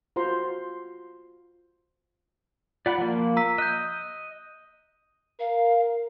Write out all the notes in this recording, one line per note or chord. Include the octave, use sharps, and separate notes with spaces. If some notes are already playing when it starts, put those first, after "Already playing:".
F4 F#4 C5 A#5 C6
F4 D5 F#5 B5
F3 A#3
A#5 E6 B6
D#5 F#6 G6
A#4 F5